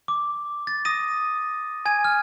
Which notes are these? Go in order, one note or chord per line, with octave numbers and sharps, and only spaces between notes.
D6
A6
D#6 A#6 D#7
G#5 G#6 D#7
F6